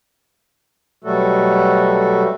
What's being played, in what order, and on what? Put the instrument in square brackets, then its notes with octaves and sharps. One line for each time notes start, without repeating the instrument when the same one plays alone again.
[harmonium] B2 F#3 G3 A3 F#4 A4